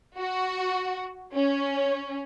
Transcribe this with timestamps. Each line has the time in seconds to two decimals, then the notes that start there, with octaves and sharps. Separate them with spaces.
0.19 F#4
1.35 C#4